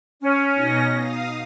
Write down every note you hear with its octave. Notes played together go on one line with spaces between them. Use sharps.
C#4
B2 D#4 A#6
F5 D#6